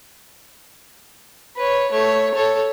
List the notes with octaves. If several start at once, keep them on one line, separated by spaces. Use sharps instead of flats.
B4 C#5
A3 C#5
A4 C#5